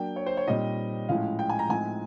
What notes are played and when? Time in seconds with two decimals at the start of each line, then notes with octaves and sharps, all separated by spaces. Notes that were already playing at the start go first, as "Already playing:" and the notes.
Already playing: F#3 A#3 D4 G5
0.16 C#5
0.26 C5
0.37 C#5
0.47 A#2 G3 C4 D#4 D#5
1.09 A2 F3 G#3 C#4 E4 F5
1.39 G5
1.49 G#5
1.59 A#5
1.69 A2 F3 G#3 C4 D#4 G#5